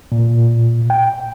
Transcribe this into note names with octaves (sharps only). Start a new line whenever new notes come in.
A#2
G5